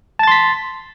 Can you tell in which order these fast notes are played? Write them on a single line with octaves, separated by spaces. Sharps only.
A5 A6 C6 B6